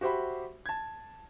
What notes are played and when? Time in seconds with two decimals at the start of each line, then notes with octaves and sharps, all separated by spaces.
0.01 F#4 G4 C5 E5 B5
0.66 A5 G#6